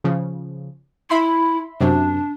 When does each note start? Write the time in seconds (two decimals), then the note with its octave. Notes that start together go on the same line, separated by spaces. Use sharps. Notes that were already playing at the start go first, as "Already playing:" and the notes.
0.04 C#3 F3
1.10 E4 E5 B5 C6
1.81 F#2 C3 D4